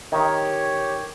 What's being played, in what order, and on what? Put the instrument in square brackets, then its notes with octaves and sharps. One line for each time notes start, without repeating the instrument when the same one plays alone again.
[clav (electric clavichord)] D#3 [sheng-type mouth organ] G4 C#5